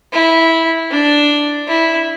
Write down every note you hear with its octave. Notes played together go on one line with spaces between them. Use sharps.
E4
D4
E4